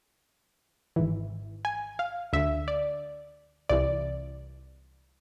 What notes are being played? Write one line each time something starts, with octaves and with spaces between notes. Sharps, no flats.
G#1 G#2 E3
G#5
F5
D2 D3 E5
D5
C2 C3 E3 D5